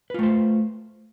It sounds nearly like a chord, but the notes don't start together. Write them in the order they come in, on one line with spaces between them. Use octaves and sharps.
B4 F4 A3 C5